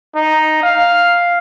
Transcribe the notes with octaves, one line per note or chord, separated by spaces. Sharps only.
D#4
F5